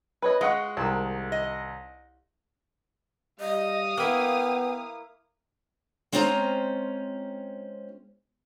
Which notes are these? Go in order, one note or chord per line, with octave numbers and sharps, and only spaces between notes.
B4 C#5 D#5
G#3 F4 D#5 F#5 C#6
C2 D#3 A5
D#5
G3 D#5 F5 D#6
A#3 B3 E4 G5
G#3 C4 C#4 F4 C5 A#5